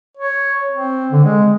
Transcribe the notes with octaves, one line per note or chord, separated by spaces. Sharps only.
C#5
C4
D3
G#3